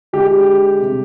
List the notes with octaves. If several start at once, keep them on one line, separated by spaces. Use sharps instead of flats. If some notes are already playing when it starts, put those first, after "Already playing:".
D3 G#3 G4
C3 G3